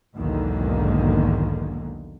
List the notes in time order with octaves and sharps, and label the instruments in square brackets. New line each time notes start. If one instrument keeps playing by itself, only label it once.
[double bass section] B1 E2 G#2 D3 D#3 A#3